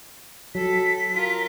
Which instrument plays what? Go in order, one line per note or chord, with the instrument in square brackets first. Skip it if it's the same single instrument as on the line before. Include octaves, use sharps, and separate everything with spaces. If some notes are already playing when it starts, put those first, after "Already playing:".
[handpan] F#3 [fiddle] A4 [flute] B6
[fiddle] F4 A#4